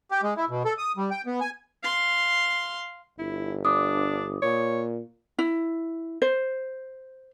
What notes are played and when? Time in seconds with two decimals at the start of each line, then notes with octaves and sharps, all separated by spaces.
0.11 G4
0.23 G#3
0.37 E4
0.50 B2
0.65 A4
0.78 D#6
0.97 G3
1.11 G5
1.26 B3
1.41 G#5
1.83 F5 C6
3.19 G1 E4
3.65 D4 D6 D#6
4.42 A#2 C#5
5.39 E4
6.22 C5